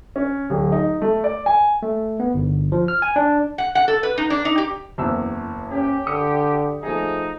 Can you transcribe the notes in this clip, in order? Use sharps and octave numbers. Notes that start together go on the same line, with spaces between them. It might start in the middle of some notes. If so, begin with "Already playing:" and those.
C#4
D1
D#4
A3
D5
G#5
A3
B3
G1
F3
F6
G#5
D4
F#5
F#5
A4
B4
D#4
D4
D#4
G4
F#1 E2 E6
C#4 G4
D3 D#6 C#7
F3 A3 D#4 G#4